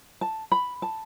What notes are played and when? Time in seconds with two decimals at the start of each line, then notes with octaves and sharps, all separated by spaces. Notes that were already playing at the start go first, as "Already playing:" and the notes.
0.21 A5
0.52 B5
0.82 A5